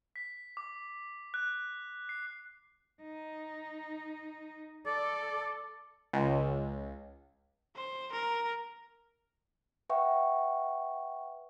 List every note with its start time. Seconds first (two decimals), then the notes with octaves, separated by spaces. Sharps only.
0.16 B6
0.57 D6
1.34 F#6
2.09 C7
3.03 D#4
4.86 A4 D5
6.13 C#2
7.76 C5
8.13 A#4
9.89 B4 E5 F#5 G5 C#6